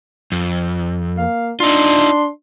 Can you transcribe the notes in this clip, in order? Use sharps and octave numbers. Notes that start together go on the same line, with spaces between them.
F2
A#3 F5
D4 D#4 F4 C6